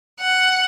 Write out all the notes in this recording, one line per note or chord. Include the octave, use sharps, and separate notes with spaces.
F#5